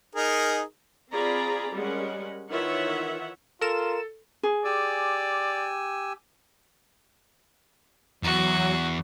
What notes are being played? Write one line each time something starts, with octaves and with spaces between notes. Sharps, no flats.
D#4 G#4 A#4
C4 F4 G#4 D5 A#5 B5
G3 G#3 C#4 A#4 F#5
D#3 E3 F4 C#5 E5 F#5
F4 A4 A#4 E7
G#4
G4 D5 G#5 E6
E2 F#3 F#4